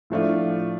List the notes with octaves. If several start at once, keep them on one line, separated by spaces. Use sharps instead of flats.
A2 F3 A3 D4 F4